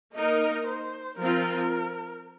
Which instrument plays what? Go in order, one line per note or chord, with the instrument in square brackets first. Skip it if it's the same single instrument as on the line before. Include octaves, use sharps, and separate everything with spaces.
[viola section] A#3 D#4 A#4 [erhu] D#5
[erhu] C5
[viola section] F3 C4 F4 [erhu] A#4